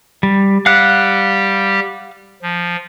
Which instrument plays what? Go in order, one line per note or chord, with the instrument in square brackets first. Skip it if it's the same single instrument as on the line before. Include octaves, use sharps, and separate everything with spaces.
[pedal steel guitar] G3
[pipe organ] G3 G4 [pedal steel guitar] F5 F#5 F#6
[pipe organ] F3